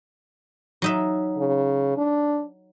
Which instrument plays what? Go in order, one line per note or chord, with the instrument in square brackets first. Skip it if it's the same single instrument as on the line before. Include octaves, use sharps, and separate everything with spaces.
[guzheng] F#3 D#4 E5
[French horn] C#3
D4